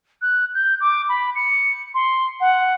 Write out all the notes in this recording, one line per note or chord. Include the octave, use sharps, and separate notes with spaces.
F#6
G6
D6
B5
C#7
C6
F#5